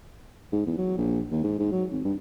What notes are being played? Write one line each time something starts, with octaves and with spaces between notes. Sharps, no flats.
G#2
E2
F#3
A#1
D#2
G#2
G#2
F#3
G#1
G2